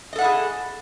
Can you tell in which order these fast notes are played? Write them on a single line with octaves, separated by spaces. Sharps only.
D#5 A4 F#5 E4 G#4